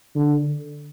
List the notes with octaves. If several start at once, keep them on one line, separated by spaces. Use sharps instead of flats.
D3